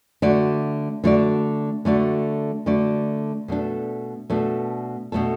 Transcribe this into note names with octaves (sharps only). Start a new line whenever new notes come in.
D3 A3 F#4 D5
D3 A3 F#4 D5
D3 A3 F#4 D5
D3 A3 F#4 D5
B2 A3 D4 A4
B2 A3 D4 A4
B2 A3 D4 A4